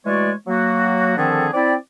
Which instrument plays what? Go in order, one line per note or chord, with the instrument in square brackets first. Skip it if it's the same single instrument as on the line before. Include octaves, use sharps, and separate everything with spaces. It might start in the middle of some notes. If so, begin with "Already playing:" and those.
[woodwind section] E3 G#3 A3 F#4 C#5 D5
F#3 A#3 F#4
D3 D#3 F3 C4 G#4 A4
C4 E4 D5